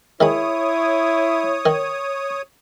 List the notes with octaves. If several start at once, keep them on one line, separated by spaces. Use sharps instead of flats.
D#3 G#3 E4 C#5 B5 D#6
D#3